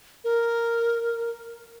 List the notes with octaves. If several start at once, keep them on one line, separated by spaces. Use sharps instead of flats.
A#4